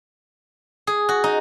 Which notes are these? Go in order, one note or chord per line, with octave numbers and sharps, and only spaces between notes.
G#4
F#4
D#4